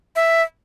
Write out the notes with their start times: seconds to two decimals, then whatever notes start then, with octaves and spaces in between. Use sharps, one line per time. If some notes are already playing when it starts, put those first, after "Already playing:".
0.16 E5